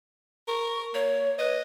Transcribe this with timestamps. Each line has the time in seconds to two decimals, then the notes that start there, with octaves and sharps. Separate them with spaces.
0.48 A#4 C#6
0.94 A#3 C#5
1.39 B4 D#5